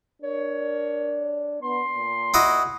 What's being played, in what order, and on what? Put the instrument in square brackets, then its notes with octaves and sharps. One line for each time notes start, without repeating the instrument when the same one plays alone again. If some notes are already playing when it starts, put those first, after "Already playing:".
[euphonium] D4 [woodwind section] A#4 C#5
[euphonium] B3 [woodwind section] C6
[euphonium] A#2
[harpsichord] E4 F#4 D#5